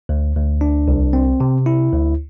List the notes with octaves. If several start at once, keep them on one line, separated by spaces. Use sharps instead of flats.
D2
D2
D4
C2
C4
C3
E4
D2